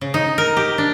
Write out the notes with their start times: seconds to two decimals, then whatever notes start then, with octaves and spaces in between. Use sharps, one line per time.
0.01 C#3
0.14 D#4
0.38 A#4
0.57 G4
0.78 D4